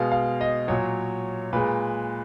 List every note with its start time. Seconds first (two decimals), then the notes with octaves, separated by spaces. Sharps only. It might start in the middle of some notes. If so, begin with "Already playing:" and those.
Already playing: B2 G#3 F5
0.12 F5
0.41 D#5
0.68 A#2 F#3 C#5
1.53 A#2 G#3 B4